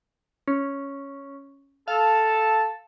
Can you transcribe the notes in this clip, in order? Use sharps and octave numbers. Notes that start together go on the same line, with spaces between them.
C#4
A4 F5 A5